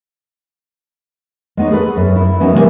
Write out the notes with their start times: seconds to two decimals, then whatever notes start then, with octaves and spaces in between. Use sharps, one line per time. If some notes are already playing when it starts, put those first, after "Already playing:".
1.57 G#3 B3 D#4 C#5
1.71 G#4 A4 B4
1.97 F#2
2.16 E4
2.40 E3 F#3 B3 C#4 D#4 F#4
2.54 C3 F3 G3 A#3 D5 G#5